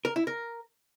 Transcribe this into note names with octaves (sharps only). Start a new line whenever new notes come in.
A#4
E4
A#4